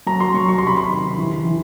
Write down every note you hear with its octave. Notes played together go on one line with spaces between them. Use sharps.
F#3 A#5
C6
F#3 C#6
C#6
C3 C6
B5
C6
D#3
E3
E3